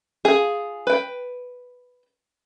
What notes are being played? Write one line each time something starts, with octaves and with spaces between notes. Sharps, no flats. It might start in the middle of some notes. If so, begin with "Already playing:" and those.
F4 G#4
B4 G5